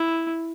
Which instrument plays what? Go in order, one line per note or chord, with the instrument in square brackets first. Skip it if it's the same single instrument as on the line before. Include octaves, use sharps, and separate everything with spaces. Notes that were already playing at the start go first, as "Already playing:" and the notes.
Already playing: [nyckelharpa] E4